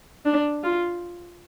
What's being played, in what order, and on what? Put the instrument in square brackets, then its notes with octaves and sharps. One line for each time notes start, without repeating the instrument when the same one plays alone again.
[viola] D4
F4